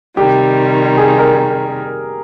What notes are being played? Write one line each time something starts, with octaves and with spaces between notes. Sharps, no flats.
C3 D#3 G3 G4
G#4
A#4